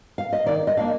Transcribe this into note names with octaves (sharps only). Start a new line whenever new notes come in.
F5
D#5
D#3 D5
D#5
A#3 D4 F5